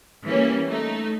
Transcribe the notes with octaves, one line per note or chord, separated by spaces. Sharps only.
E3 G3 A#3 C#4
A3 D#4